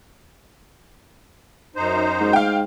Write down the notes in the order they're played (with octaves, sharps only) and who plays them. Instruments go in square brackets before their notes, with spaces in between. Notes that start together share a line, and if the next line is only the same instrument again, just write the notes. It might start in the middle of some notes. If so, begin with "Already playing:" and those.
[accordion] F#2 D#4 C5
[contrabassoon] G#2
[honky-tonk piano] F5 G5